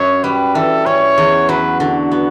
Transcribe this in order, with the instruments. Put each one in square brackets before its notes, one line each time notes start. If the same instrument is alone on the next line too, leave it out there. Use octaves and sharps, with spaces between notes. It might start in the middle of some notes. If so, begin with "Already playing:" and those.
Already playing: [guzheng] F#2 [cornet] C#5
[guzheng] G3 [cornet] B4
[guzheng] E3 [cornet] A4
[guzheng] C#4 [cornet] C#5
[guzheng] E2
[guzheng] F#3 [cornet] B4
[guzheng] D3 [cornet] F#4
[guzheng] B3